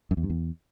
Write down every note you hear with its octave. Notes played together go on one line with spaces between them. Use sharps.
F#2
E2
G2
E2